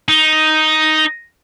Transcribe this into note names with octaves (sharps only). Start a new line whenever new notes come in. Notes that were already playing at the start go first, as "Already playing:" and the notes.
D#4